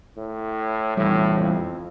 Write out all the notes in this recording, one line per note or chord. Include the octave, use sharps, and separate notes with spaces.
A2
E2 A2 C3 E3 G3
F2